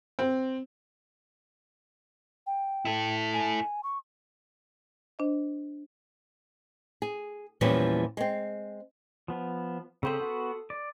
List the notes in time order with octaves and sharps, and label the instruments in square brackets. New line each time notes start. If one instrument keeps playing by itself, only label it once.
[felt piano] C4
[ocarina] G5
[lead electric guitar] E4 A4
[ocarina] G#5
C#6
[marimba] D4 C5 D#5
[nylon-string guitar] G#4
E2 A#2 E3 F3 G3 C#4
G#3 C4
[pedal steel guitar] F3 B3
[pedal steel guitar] C#3 C4 C5 [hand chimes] A4 C6 E6
[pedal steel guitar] B3 F#4
D5